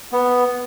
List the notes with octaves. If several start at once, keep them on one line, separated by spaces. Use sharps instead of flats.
B3